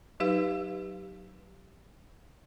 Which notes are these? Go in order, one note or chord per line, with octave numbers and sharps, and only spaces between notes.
F#3 D#4 G4 B4 F5